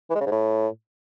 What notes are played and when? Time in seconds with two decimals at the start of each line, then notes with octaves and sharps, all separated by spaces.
0.10 E3
0.15 G#3
0.21 C#3
0.26 G#2
0.32 A2